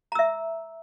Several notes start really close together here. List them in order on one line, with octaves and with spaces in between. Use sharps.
A#5 E6 E5